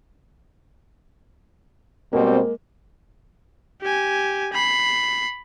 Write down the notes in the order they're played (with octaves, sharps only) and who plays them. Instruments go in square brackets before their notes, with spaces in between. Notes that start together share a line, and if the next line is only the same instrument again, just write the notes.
[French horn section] B2 G3 C4 [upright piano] G#3 A#3
[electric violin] G4 G#5
B5 C7